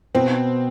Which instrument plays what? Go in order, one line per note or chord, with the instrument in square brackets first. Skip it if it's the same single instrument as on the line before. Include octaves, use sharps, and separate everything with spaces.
[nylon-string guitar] B2 [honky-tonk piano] C4